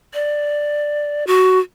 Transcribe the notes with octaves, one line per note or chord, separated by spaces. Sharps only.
D5
F#4